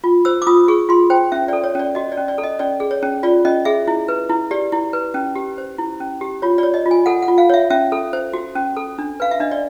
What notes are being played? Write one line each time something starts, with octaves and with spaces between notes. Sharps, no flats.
F4
C5 E6
D6
F4 D#6
G#4 C#6
F4 C6
C5 G5
C#4 E5
A4 D5
C#5
C#4 D5
F#4 D#5
D5
C#4
D5
A4
D#5
C#4 D5
G#4
C#5
C#4
F4 D5
C#4 D#5
G#4 E5
E4
B4
E4
G4 D5
E4
B4
C#4
G4
C5
E4
C#4
G4
F4 C#5
C#5 D5
D#5
F4
G#5
A4 F#5
F#5
F4
F5
C#5 E5
C#4 E5
A4
C5
F#4
C#4
A4
D4
B4 F5
E5
D4 D#5
D5